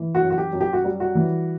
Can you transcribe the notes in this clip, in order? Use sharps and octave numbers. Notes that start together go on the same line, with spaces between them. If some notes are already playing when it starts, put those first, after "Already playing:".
Already playing: E3
F#4
F#2
F#4
G4
F#2
G4
F#4
G3
F#4
E3